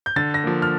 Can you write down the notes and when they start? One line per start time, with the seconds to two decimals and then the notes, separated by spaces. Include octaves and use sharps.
0.06 G6
0.16 D3 A6
0.34 A#6
0.44 F3 A#3
0.62 F6